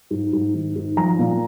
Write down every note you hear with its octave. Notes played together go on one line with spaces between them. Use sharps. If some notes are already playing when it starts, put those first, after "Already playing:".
G#2
G#2
D#3
G#2
F3 A#5
A#2